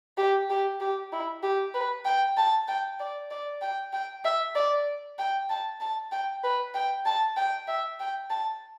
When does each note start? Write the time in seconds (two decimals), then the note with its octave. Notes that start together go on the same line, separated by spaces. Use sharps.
0.18 G4
0.50 G4
0.81 G4
1.12 E4
1.43 G4
1.75 B4
2.05 G5
2.37 A5
2.68 G5
3.00 D5
3.31 D5
3.62 G5
3.93 G5
4.25 E5
4.55 D5
5.19 G5
5.49 A5
5.80 A5
6.12 G5
6.44 B4
6.74 G5
7.06 A5
7.37 G5
7.68 E5
8.00 G5
8.30 A5